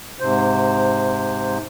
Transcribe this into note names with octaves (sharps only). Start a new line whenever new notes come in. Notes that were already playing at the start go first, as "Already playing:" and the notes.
G#2 C3 C5